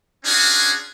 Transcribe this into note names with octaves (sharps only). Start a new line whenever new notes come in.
C#4 D4 F4 F#4 G#4